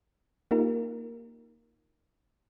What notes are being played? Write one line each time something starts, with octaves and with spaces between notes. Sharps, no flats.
A#3 D#4 F4 G4 A#4